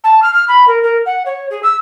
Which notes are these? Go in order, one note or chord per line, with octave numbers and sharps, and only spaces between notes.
A5
F6
F6
B5
A#4
A#4
F#5
C#5
G#4
E6